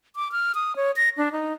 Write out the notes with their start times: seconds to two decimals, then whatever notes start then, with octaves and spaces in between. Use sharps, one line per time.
0.16 D6
0.32 F6
0.55 D#6
0.76 C#5
0.96 A#6
1.18 D4
1.32 D#4